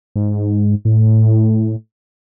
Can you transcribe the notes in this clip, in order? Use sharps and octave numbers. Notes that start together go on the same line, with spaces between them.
G#2
A2